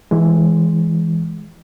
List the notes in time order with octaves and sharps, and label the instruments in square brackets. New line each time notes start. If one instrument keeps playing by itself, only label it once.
[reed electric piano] E3 G#3